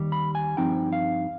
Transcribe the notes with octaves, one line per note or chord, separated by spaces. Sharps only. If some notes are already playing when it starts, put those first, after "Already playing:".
Already playing: D#2 D#3 G3
B5
G#5
G2 F3 C4 D#4 G5
F5